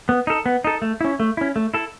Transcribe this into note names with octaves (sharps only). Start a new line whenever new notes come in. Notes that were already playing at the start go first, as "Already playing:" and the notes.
B3
D#4 A4
B3
D#4 A4
A3
C#4 E4
A3
C#4 E4
A3
E4 A4